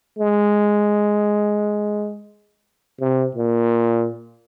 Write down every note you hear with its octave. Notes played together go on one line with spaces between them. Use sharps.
G#3
C3
A#2